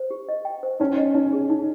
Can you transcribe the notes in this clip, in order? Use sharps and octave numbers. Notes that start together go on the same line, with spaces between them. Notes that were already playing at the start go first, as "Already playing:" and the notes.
Already playing: C5
G4
D#5
G5
C5
C#4 D#4
D#5
C#4 D#4
G#4
D#4